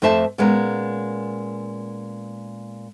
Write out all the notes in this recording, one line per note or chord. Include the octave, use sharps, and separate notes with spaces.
F2 A3 C5 E5 A5
A#2 G#3 B3 C#4 A#4